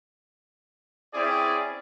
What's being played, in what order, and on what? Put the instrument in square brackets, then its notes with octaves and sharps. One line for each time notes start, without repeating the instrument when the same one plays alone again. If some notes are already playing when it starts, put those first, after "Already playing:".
[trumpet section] C4 C#4 E4 G#4 D5